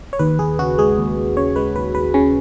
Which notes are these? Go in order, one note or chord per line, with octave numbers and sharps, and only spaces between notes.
C#5
D#2 B4
D#2 G#4
C#3 F#4
G#3 G#4
D#2
D#2
C#3 C#5
G#3 B4
D#2 B4
D#2 B4
C#3 C#4